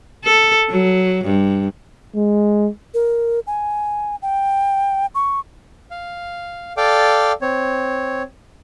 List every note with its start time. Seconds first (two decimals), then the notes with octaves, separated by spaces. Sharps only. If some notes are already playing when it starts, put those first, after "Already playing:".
0.25 A4
0.70 F#3
1.25 G2
2.15 G#3
2.94 A#4
3.47 G#5
4.22 G5
5.15 C#6
5.91 F5
6.77 A4 D5 F5 G5 D6
7.42 C4 C#5